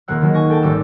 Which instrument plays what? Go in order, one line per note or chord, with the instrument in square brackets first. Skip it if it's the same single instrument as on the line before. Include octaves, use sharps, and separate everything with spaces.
[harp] D#1 G#3 A#3 F#5 E6
D#3 F#3 G#3
G#5 C#6 A#6
A4 G5 A5
G#1 G3 C#4 D6 E6 E7